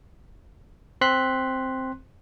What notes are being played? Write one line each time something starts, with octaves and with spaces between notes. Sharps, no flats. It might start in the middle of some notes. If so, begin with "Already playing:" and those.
C4 C6 F#6 B6